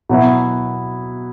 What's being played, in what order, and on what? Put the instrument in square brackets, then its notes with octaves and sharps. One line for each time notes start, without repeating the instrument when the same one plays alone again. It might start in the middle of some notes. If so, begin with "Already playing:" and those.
[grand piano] B2 F#3 B3 E4